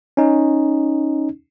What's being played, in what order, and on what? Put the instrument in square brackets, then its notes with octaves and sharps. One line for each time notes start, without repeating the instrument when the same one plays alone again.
[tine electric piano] C#4 D#4